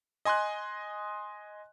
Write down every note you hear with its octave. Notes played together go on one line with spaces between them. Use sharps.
D#5 G#5 C6 D#6 F#6